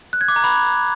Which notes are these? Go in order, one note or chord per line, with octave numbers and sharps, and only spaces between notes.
F#6
G#6
D6
A#5
B5